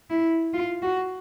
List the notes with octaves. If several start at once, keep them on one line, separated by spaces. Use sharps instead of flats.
E4
F4
F#4